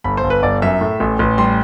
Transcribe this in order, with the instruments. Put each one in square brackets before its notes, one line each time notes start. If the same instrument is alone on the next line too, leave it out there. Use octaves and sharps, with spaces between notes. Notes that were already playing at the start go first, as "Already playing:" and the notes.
[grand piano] G1 B5
C5
G1
B4
G1 D5
F#2 E5
A2
A1
A1
G3 C6